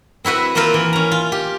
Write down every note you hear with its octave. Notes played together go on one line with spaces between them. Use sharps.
C4 E4 F#4 B4 E5
A#3 C4 E4 F4 A#4 C5
E3
C#4 A#5
F4
G4